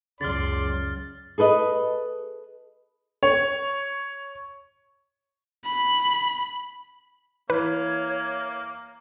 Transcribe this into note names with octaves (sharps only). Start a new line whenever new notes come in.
C#2 F#2 C#3 D5 C6 F6 A6
G#4 A4 B4 D#5
C#5
B5
E3 A#3 B4 C#5